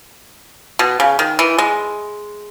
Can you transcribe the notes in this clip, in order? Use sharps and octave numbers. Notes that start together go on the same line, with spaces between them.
B2
C#3
D#3
E3
G#3